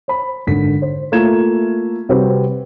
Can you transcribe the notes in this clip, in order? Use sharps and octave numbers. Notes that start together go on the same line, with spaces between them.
C5 B5
G#1 D3 B6
C5
A3 A#3 E4 F4 G#6 E7
C3 G3 C4 F#4 G4 B4